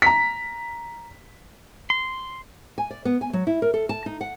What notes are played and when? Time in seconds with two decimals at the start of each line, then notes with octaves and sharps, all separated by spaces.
0.02 A#5 B6
1.90 C6
2.78 G#5
2.91 D5
3.05 B3
3.21 G#5
3.33 F#3
3.47 E4
3.62 A#4
3.74 A4
3.89 A5
4.06 D#4
4.21 F#5